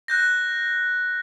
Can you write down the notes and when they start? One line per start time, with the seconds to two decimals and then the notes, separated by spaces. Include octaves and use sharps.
0.08 F#6 G6 A#6